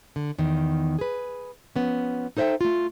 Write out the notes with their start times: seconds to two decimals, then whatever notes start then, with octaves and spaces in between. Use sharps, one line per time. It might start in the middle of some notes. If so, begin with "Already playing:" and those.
0.16 D3
0.38 E2 D#3
0.99 G#4 B4
1.76 F3 B3 C#4
2.37 D#4 A4 C5 D#5 E5 G5
2.61 A3 F4